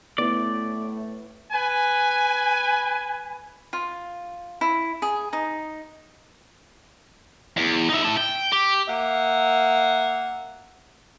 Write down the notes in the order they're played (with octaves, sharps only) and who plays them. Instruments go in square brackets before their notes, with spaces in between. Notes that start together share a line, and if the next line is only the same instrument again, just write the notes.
[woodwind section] A2 A3 [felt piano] B3 E4 [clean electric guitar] D5
[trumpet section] B4 G#5
[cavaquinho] F4
E4
G#4
D#4
[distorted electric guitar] E2
D#4 E5
E4 A5
G5
G4
[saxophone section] A#3 E5 F#5